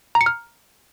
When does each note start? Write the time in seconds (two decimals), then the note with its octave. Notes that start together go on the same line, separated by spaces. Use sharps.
0.15 A#5
0.21 C#7
0.26 F6